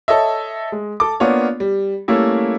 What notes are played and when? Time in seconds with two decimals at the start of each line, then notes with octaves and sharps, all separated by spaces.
0.08 A4 C#5 D#5 E5
0.72 G#3
1.00 A4 D6
1.20 A#3 B3 D4 F4 C#5
1.60 G3
2.08 G3 A3 A#3 C#4 E4